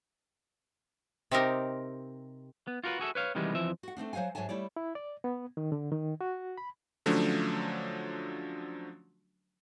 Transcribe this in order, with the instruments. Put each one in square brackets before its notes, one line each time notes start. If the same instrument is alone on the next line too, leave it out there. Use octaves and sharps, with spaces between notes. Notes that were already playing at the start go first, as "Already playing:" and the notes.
[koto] C3 C4 D#4 G4 A#4
[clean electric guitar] B3
F4 F#4 A#4 B4
F#4 G#4 A4 E5
B4 C#5 F5
C3 D#3 E3 G3 G#3 B3
F2 E3 F3 E5
[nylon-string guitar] F#4 F#5
A3 A#3 C4 D4
F#3 C5 F5 F#5 G#5
G#2 F#3 C#5 E5 G#5 A5
G3 A3 E4 C#5 D5
[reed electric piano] E4
D5
B3
D#3
D3
D#3
F#4
B5
[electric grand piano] D3 F3 F#3 A3 C#4 D4